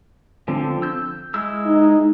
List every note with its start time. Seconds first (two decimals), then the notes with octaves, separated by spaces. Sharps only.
0.48 D3 F3 C4
0.82 E6 G6
1.34 G#3 E4 E6
1.66 D#4